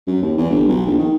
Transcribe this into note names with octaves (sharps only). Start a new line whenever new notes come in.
F#2
D#2
E2
G1
B1
A#1
D#3